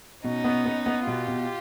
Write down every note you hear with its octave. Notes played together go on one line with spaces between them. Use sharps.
B2 C#4 D#4
B3
B3
B3
B2 F4 G4
B2